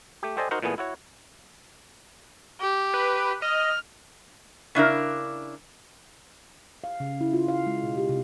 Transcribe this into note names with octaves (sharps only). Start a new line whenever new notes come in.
A3 G4
G4 A4 C5 D5 D#5 G#5
D#4 F#4 A#4 C5 F#5
A#2 E3 A3 B3 G#4
E4 F#4 C#5
G4
B4
D#5 F6
C#3 D4 E4 A#4
F5
C#3
E4
F4
F5
G#3
B2
G4
C3